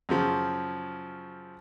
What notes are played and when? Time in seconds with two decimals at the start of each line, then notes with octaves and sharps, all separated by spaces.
0.09 F#2 C#3 F3